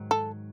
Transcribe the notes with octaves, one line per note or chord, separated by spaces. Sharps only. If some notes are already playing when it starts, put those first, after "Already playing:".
Already playing: G#2 D#3 F#3
A4